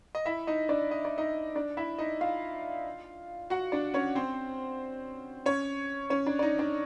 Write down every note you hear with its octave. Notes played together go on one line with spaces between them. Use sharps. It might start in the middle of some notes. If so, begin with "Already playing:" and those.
D#5
E4 E5
D#4 D#5
D4 D5
D#5
D5
D#4 D#5
D4 D5
E4 E5
D#4 D#5
F4 F5
F#4 F#5
D4 D5
C#4 C#5
C4 C5
C#4 C#5
C#4 C#5
D4 D5
D5
D#4 D#5
D4 D5